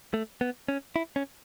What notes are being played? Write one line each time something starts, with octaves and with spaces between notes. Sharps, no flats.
A3
B3
C#4
E4
C#4